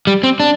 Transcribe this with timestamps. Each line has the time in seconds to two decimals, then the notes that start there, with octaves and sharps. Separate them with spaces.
0.07 G3
0.23 C4
0.40 D4